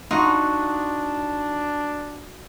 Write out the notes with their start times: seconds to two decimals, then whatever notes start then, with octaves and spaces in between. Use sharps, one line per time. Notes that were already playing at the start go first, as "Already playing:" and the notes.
0.11 D4 D#4 F4 F#4 D#5